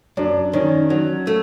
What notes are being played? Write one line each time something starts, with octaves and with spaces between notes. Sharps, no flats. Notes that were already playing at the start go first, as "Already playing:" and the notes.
F#2 D4
D#3 C#4
F#3
A3